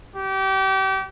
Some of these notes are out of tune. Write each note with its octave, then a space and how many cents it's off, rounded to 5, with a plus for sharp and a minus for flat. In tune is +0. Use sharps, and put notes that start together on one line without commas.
G4 -30